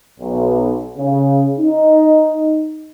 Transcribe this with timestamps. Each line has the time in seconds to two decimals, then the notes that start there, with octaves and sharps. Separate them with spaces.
0.20 B1
0.97 C#3
1.59 D#4